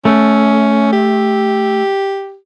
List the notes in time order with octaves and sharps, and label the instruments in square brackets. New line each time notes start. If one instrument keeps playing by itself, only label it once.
[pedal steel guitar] A3 [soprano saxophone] C#4
[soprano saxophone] G4